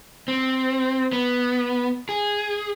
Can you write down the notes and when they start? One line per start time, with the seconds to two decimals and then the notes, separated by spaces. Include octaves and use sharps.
0.28 C4
1.13 B3
2.09 G#4